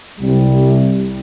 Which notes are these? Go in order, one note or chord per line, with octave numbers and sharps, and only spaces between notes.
C2 C3 G3